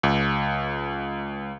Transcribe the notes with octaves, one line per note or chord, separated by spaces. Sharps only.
C#2